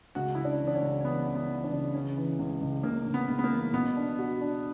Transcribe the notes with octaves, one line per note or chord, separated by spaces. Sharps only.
C#2 F#4
C#3 E4
D4
E3
D4
C#4
C#2
C#4
E3 B3
E3
B3
E3
D4
C#3
C#3 C#4
E3
C#2
C#2
C#3 A#3
C#2
B3
C#2
B3
A#3
E3
B2 B3
D4
F#4
D4